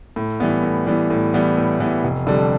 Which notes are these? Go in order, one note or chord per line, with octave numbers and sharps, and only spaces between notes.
A2
E3 G3 B3
A2
E3 G3 B3
A2
E3 G3 B3
A2
E3 G3 B3
F1
F2 D3 G3